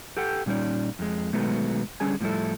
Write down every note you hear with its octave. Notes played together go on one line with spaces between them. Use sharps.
G4 A4 F#5 G5
A#2 G3 C#4 D#4 D5
F2 G#3
B2 D#3 F#3 G#3 A3 B3
D3 G3 C#4 G#4 G#5
A2 F3 G3 C4 E4 A4